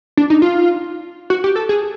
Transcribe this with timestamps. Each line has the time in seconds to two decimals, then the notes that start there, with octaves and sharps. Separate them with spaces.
0.17 D4
0.30 D#4
0.42 F4
1.30 F#4
1.44 G4
1.56 A4
1.69 G#4